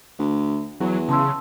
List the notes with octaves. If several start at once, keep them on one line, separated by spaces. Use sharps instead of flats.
D2
E2 F#3
C#3 A5 C6 E6